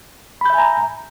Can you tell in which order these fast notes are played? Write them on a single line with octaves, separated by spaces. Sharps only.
B5 G6 E5 G#5 A#5